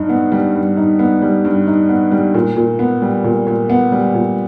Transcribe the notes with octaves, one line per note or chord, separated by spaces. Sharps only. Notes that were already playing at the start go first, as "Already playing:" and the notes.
Already playing: G2 D#4
B3
G3
G2
D#4
B3
G3
G2
D#4
B3
G3
A#2
A#2
B3
G3
A#2
A#2
B3
G3
A#2